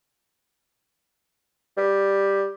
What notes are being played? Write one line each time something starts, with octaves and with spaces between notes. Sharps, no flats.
G3